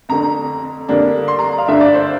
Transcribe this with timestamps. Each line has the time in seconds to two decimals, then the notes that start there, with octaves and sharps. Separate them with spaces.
0.09 F2 D3 A3 C4 A#5
0.89 F2 D3 G3 A#3 D4
1.28 C6
1.39 A#5
1.58 F5
1.68 G2 D3 A3 D4 E5
1.81 D5
1.94 C5